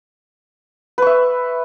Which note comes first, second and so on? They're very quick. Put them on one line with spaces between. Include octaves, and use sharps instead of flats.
B4 C#6 E5